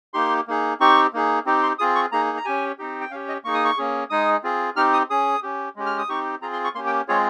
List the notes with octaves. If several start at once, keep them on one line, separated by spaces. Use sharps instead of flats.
A#3 D#4 G4 C6
A#3 D#4 G#4
C4 D#4 G4 C#6
A#3 D#4 G#4
C4 D#4 G4
C6
C4 F4 G#4 D#6
C#6
A#3 D#4 G#4 A#5
A#5
C#4 G4 G#5
C4 D#4 G4
G5
C#4 G4 F5
D#5
A#3 D#4 G#4 C#6
D#6
C#6
A#3 C#4 G#4
G#3 D#4 G#4 D#6
C4 F4 G#4
C4 D#4 G4 F6
D#6
C#4 G#4 D#6
C#4 G4
G#3 C#4 G4
F6
D#6
C4 D#4 G4 C#6
C4 F4 G#4 A#5
C6
C#6
A#3 C#4 G4 C6
G5
G#3 C4 F4 G#4 C#5